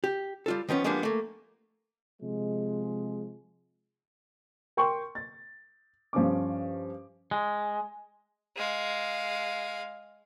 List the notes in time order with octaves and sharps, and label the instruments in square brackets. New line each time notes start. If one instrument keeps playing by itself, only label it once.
[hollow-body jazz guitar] G4
G3 F4 A4
D#3 F3 B3 C#4
F3 G3 G#3 A#3 B3 D4
A3 A#3
[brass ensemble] C3 F3 G#3
[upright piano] A#4 G5 C6 C#6
A6
G2 F3 C#4 D6
[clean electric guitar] G#3
[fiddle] G#3 F5